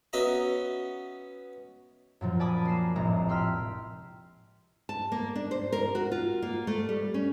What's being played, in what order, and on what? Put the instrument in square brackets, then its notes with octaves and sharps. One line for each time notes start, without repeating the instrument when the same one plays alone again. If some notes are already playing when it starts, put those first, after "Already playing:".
[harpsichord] B3 C#4 F#4 D#5 E5 A#5
[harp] F#2 A#2 F3
D5 G#5 A5 B5 D6 D#6
A#3 C7 E7
F1 A#1 A2 G#3 A#5
G5 C6 E6 F6 B6
[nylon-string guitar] A5
A#3
D4
C5
A#4
F#4
F4
A#3
A3
G3
C#4